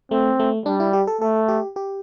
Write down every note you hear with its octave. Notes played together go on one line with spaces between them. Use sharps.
A3 C4
A3
G3 D4
E4
G4
A4
A3 A4
G4
G4